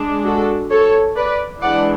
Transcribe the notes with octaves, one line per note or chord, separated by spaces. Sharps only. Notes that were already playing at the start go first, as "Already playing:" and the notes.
Already playing: G#3 D4
F#4 A4
A4 C#5
B4 D5
E3 G#3 D4 D5 F#5